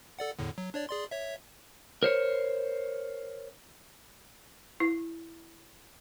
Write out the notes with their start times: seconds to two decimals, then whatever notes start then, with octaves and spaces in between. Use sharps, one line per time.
0.19 A4 D5 F#5
0.39 E2 A2 D3
0.58 F#3
0.74 D4 C#5 D5
0.89 G#4 D5 C6
1.11 C#5 E5
2.03 A#4 C5 C#5
4.80 E4